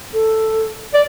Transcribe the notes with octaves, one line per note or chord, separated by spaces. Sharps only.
A4
D5